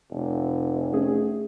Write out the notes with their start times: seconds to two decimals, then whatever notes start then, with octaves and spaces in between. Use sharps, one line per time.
0.11 F1
0.93 A3 C#4 G#4